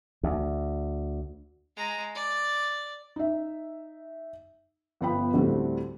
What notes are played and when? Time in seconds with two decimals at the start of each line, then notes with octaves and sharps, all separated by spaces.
0.23 D2
1.77 G#3 A#5
2.15 D5
3.16 D#4 E5
5.01 G1 F3 B3 G5 B5
5.34 D2 A2 D3 G3 A3 C4